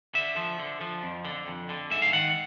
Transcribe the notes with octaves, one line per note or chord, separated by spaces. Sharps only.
D3 E5
F3
D3
F3
F2
D3
F2
D3
G#2 E5
F5
D#3 F#5